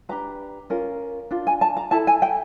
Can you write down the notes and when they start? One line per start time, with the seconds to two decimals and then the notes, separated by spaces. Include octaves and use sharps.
0.09 D4 G4 B4 A#5
0.70 C#4 F4 A#4
1.31 D4 F4
1.47 G#5
1.61 A5
1.77 A#5
1.91 E4 A4 A5
2.07 G#5
2.22 G5